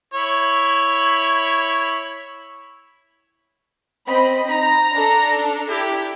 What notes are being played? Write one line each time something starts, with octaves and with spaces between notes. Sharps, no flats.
E4 C#5
C4 D#5 B5
D#4 A#5
D4 A4
E4 G4